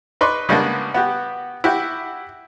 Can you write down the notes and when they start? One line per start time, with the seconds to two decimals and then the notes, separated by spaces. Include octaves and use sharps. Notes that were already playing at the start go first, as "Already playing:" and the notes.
0.21 D#4 B4 D5 C6 C#6
0.49 C#3 G3 G#3 A#3 B3 D4
0.94 B3 F#4 G4
1.64 E4 F#4 G4